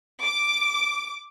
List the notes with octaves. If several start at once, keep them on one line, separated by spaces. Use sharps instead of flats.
D6